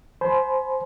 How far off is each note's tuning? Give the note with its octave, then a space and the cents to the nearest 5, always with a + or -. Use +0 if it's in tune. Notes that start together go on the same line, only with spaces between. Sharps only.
C5 +0 G#5 +35 B5 +0